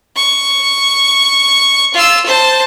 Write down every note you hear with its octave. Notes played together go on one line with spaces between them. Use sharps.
C#6
F4 E6
C5 A5